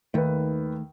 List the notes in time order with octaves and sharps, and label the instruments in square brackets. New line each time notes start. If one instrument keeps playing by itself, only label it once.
[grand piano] D#2 B4 [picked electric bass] D#3 A3